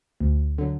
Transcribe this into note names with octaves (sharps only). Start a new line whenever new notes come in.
D2
D3 F#3